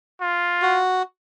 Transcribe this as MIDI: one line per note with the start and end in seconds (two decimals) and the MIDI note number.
0.21 0.82 65
0.62 1.03 66